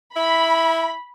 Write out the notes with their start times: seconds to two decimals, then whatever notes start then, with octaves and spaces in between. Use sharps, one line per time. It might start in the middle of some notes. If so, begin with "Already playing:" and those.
0.16 E4 B5